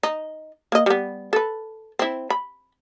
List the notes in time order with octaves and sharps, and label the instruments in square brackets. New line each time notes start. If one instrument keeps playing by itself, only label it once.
[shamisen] D#4
A#3 D#5
G3 B3
A4 B4
C4 E4
B5